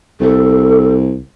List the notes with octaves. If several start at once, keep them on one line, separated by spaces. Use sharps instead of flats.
C2 A4